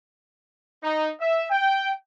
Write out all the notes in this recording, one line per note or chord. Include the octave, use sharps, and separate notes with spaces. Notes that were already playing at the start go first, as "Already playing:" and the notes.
D#4
E5
G5